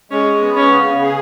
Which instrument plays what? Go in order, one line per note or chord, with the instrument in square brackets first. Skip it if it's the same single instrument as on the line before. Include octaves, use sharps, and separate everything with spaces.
[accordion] G#3 [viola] C#4
[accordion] B3
[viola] C#4
[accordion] C#3
G#4